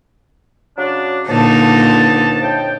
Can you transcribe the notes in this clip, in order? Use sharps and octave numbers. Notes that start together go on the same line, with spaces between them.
C#3 F#3 D4
C#2 A#2 D3 F3 D#4 A5
F2 A2 G5